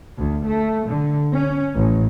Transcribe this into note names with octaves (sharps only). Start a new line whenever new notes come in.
D2
A3
D3
C#4
A1